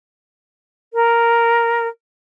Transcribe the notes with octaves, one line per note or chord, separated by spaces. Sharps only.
A#4